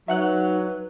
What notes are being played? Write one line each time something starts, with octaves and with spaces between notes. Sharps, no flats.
F#3 D#4 B4 E5 F#5 F#6